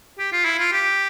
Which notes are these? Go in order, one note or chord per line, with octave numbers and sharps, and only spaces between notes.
G4
F4
E4
F4
G4